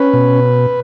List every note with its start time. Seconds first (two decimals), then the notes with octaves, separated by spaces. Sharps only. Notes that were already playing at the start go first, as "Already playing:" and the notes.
Already playing: C#4 B4
0.13 B2